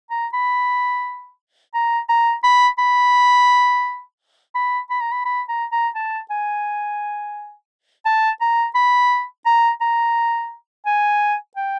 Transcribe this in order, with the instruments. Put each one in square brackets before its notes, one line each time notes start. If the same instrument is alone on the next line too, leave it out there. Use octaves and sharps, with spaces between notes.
[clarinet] A#5
B5
A#5
A#5
B5
B5
B5
B5
A#5
B5
B5
A#5
A#5
A5
G#5
A5
A#5
B5
A#5
A#5
G#5
G5